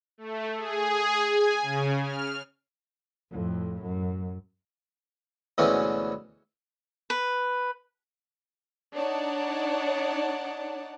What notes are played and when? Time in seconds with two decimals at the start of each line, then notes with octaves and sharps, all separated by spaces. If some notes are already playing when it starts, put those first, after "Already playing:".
0.18 A3
0.57 G#4
1.22 G#5
1.62 C#3
2.02 F6
3.31 F2 A2
3.82 F#2
5.58 D2 B2 E3 G#3 C4 C#4
7.10 B4
8.95 D4 D#4 C#5 D5 F#5 A5